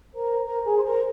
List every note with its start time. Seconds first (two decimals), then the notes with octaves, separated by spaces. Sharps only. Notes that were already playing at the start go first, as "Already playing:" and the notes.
0.14 A#4 C5 A#5
0.45 A#4 C5 A#5
0.65 G#4 G#5
0.76 C5 C6
0.85 A#4 A#5